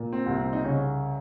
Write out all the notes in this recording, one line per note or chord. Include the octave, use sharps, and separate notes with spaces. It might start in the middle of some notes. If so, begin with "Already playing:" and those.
Already playing: A#2
C4
C2
C4
D#4
C#3 C#4